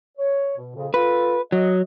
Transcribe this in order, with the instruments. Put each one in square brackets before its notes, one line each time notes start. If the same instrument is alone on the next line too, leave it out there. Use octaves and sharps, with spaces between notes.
[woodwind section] C#5
B2
F2 A#2 C#3
[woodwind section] F4 A4 [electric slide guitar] B4
[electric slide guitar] F#3 [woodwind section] D#5